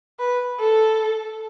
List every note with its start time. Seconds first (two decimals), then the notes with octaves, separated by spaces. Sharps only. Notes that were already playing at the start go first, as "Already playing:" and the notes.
0.19 B4
0.59 A4